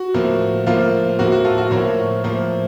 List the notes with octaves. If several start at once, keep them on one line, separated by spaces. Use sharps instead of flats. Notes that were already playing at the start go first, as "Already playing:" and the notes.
Already playing: F#4
A2 F3 A#3
A2 F3 A#3 F4
A2 F3 A#3 F#4
F#4
F4 A4
F#4
A2 F3 A#3 A#4 C#5
A2 F3 A#3